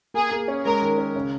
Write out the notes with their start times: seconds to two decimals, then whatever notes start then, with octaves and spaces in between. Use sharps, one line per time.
0.14 A#3 G#4
0.31 A#3
0.48 C#4
0.65 G#3 A#4
0.82 D#3
0.98 C#4
1.16 C#3